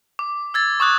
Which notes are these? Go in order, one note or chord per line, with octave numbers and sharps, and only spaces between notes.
D6
E6 G#6 A6
C#6 D#6 F#6 G#6